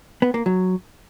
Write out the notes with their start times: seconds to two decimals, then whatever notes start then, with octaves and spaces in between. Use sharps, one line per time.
0.22 B3
0.34 A#3
0.46 F#3